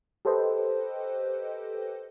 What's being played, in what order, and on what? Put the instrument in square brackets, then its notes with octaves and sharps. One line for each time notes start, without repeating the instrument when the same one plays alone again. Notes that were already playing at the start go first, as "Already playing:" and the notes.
[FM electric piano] G4 A4 B4 C5 D#5 G5